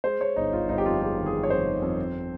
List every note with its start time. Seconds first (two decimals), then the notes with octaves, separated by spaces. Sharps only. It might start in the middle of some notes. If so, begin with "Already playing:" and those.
0.04 G#3 C5
0.20 G#3 C#5
0.36 G1 D#4
0.53 G1 F4
0.69 G1 D#4
0.78 G4
0.85 F2 F4
1.02 G#3 G4
1.17 D#3
1.26 G#4
1.33 G#3
1.43 C#5
1.50 F2 C5
1.67 D#3
1.82 F2
1.98 C4